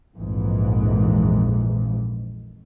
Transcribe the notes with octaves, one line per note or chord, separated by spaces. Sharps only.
A#1 F2 G#2 E3